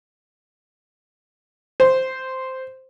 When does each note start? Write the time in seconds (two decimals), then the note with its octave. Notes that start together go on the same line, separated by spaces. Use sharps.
1.80 C5